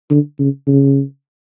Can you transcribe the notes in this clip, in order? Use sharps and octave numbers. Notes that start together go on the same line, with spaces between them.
D3
C#3
C#3